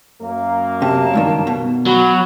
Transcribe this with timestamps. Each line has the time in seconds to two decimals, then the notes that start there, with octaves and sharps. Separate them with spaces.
0.21 F#2 A#3
0.82 C3 A5
1.13 C#2 G2 D#3
1.47 B2
1.87 F#3 B5